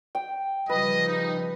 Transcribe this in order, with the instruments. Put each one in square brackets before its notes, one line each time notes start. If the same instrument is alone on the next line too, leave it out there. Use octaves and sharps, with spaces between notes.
[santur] G5
[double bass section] C#3 F3 G3 [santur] B4 [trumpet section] D#5
[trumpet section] D#4